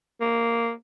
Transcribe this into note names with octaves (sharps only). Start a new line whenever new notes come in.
A#3